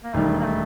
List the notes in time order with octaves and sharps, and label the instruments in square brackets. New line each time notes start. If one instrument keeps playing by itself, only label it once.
[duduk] A#3
[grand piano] E1 D#2 D#3 G3 [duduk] A3
[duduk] A#3
A3